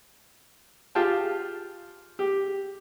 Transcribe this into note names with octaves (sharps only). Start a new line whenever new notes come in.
F4 G4 G#4 F5 G5 A5
G4